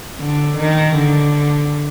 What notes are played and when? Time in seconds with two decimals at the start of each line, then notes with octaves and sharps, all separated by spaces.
0.20 D3
0.58 D#3
0.95 D3